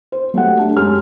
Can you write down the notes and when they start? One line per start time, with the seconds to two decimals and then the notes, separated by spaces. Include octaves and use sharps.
0.12 C5
0.34 F#3 A3 G4 F#5
0.57 A3 D4 G4
0.76 F#2 G#3 G4 F6